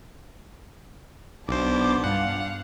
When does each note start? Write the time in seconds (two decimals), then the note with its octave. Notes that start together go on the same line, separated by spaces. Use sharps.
1.49 B1 B3 D4 C5 D6
2.04 G2 G3 F5 F#5